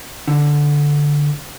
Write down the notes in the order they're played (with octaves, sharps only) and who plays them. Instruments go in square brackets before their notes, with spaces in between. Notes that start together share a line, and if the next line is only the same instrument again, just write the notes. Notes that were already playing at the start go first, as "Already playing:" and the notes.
[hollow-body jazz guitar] D3